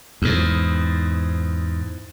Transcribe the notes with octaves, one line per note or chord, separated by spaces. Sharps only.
E2 G#2